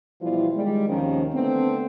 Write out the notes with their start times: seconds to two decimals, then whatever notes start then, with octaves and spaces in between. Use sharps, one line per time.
0.21 B2 E3 F3 G3 E4 F4
0.54 D#3 G3 G#3
0.88 D#2 C3 D#3 F3 A#3 C#4
1.33 D3 A3 B3 C4